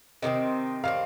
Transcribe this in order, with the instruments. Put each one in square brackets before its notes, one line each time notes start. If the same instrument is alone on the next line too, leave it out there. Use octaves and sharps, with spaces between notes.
[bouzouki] C3 D#3 A3 C4 [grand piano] D#5
[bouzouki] D#3 G3 C4 [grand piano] F5